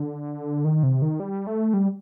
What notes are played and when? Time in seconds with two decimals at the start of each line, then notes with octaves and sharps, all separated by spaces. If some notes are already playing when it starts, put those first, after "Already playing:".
Already playing: D3
0.64 D#3
0.83 C3
1.02 D#3
1.20 G3
1.47 A3
1.74 G3